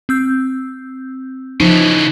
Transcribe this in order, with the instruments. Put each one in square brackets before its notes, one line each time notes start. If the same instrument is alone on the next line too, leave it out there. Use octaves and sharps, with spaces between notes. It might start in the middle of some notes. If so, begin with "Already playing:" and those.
[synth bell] C4 E6 G6
[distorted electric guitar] C#3 E3 [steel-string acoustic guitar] F3 [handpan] D#4